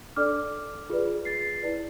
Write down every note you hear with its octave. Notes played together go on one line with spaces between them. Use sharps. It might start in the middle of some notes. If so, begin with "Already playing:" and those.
D4 A4 D5 D6 F6
F4 G#4 B4 D5
A6 C7
E4 B4 D5